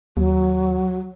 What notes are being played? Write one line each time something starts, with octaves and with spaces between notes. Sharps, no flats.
D#2 F#3